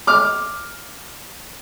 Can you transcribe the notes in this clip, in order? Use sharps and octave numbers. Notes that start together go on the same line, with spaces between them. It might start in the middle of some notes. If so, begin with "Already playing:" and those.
D6 F6